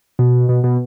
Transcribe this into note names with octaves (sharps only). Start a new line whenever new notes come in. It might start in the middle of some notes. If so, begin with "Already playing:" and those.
B2
B2
B2